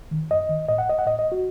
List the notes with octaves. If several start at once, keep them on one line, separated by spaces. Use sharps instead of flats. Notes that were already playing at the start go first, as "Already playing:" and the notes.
D#3
F#2 D#5
D#3
A2 D#5
F#5
D#5
F#5
A2 D#5
D#5
F#4